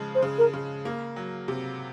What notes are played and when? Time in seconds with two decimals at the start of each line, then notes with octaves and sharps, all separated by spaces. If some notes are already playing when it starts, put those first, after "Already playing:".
Already playing: C#3 F3 G#3
0.15 C5
0.23 C#3
0.38 A#4
0.54 C#3
0.85 A#3
1.16 F#3
1.48 C3